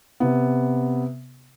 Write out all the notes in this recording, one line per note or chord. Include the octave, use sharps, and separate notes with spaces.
C3 B3